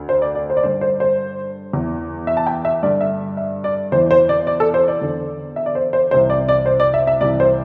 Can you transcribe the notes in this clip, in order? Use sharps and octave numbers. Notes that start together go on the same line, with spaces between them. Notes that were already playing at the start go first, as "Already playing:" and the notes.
Already playing: D2 D3
C5
D5
D5
C5
D5
G2 D3 C5
C5
C5
E2 E3
E5
A5
G5
E5
G2 D3 D5
E5
E5
D5
E2 E3 C5
C5
D5
D5
A4
C5
D5
E2 D3
E5
D5
C5
C5
C2 C3 E3 C5
D5
D5
C5
D5
E5
E5
C2 C3 E3 D5
C5